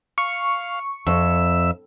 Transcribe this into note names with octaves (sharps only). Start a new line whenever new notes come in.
F5 C#6
F2 E5 E6